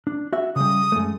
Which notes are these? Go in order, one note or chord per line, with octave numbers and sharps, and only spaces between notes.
D4
F#4 E5
C#3 G3 D#6
F#2 G#3 A3